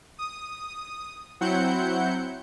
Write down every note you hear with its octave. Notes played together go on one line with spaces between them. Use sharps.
D#6
F#3 C4 E4 F#5 G6 C#7